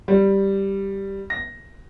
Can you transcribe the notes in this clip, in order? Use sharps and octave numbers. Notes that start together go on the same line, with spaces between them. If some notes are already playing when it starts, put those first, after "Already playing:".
G3
A#6